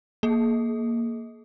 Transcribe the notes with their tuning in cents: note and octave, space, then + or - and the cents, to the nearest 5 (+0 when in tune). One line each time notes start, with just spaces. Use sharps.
A#3 +0 G#4 +35